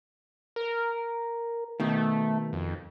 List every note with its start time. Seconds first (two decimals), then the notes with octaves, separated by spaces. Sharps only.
0.56 A#4
1.80 B2 D#3 A3
2.53 F2